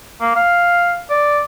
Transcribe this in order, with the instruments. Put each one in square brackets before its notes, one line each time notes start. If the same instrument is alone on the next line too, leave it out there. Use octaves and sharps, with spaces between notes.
[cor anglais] A#3
F5
D5